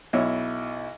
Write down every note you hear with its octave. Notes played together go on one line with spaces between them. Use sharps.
B1 E4 C#5